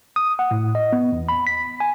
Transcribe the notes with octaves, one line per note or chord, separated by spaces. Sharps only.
D#6
F#5
A2
D#5
B3
E2
B5
B6
G#5